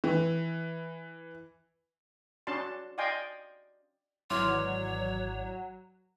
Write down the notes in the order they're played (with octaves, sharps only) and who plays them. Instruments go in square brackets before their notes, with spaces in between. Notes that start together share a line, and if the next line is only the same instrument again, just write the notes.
[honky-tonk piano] E3
[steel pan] C#4 D4 F#4 A5 C6
D5 D#5 F5 G5 G#5 C6
[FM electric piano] G#1 E3 D5 [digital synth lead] F#3 [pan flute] C#5 [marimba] C6 D6 F6